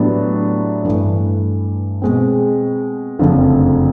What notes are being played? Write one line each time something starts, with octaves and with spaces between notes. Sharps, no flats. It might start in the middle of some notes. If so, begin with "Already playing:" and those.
Already playing: A2 F#3 B3 D4 G4
G2 E3 A3
B2 G#3 C4
F#1 F2 D3 F3 A3